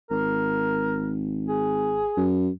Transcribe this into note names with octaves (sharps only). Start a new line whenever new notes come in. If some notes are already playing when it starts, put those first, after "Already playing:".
G#1 A#4
G#4
F#2